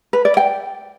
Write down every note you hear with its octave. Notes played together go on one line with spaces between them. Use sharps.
B4
D5
G5